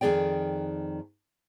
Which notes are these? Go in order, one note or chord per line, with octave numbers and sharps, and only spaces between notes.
F2 D#3 F#4 G#4 D5 G5